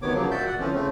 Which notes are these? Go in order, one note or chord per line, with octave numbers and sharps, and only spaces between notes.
D2 C3 D#3 B3 C#5 D6
C#3 F3 F#3 A#3
A#2 F#4 D5 E5 G6
D5 F#5
D3 E3 F3 C4 C#4
C#3 A3 C4